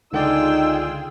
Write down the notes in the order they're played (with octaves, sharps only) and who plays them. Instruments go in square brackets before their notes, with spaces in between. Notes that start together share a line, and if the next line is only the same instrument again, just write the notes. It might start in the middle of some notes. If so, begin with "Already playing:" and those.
[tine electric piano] C#2 D3 D5 [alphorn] D#4 [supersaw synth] F4 G#4 [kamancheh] G5 E6